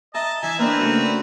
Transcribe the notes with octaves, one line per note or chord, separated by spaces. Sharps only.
D#5 E5 A5 A#5
E3 E5 G#5
A#3 C4 D4 A#4 B4
C#3 A3 F#4